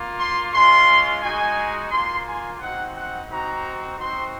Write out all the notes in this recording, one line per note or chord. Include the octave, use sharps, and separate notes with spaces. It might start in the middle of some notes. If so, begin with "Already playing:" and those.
Already playing: A#3 F4
C6
G#3 C#4 F4 C6
G#3 D#4 F#4 G#5
A#3 F4 C6
G#5
C4 D#4 F#4 F#5
F#5
C4 D#4 F#4 A#5
C4 D#4 F#4 C6